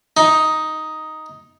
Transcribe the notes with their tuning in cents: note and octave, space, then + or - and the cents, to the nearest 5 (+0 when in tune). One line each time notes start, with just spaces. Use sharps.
D#4 +5